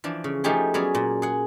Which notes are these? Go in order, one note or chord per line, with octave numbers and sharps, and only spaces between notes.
E3 F3 D4
C#3
F3 A3 D#4 G4 G#4 C6
F#3 B3 C#4 G#4 D5
A#2
G#4 F#5